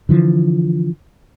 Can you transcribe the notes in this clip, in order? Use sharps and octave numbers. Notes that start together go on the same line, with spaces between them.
D3 E3 F3